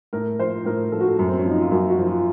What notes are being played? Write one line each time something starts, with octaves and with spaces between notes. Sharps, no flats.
A2 A#4
F3 C5
A2 A#4
F3 A4
F#4
A4
F#2
C4
C#4
F3
D#4
F4
F#2 F#4
F#4
F3
F4